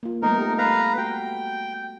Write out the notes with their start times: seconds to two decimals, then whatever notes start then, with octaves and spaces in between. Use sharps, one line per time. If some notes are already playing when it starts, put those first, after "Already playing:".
0.03 A#3 F4
0.22 G3 A3 B3 D#4 A#4
0.39 G4 A4
0.58 B4 F5 A#5
0.98 F#4 G5